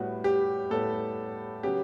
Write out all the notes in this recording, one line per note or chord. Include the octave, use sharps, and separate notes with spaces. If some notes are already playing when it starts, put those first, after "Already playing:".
Already playing: A2 G3 B3 F#4
G4
A2 G3 B3 A4
C#3 F#3 B3 G4